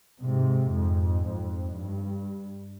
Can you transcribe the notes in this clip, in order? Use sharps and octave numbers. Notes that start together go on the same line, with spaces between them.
G#2 C3
F2 G#2
F2
G2